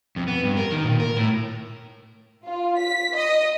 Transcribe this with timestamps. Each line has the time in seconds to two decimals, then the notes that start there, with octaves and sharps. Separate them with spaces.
0.16 F2
0.28 B3
0.43 G2
0.57 A#4
0.72 D#3
0.85 A#2
1.00 A#4
1.17 A2
2.44 F4
2.79 B6
3.16 D#5